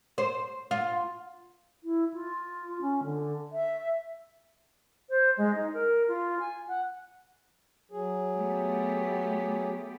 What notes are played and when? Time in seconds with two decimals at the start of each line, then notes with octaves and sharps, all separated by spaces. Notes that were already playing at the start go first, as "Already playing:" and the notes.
0.18 C5
0.71 F4
1.84 E4
2.14 F4
2.82 C#4
3.04 D3
3.52 E5
5.10 C5
5.37 G#3
5.55 D#4
5.73 A#4
6.08 F4
6.40 G#5
6.68 F#5
7.91 F#3 G#4
8.36 A3 B3 G4